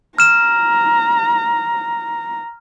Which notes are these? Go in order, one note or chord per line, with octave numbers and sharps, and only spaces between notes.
A#5 F6 E7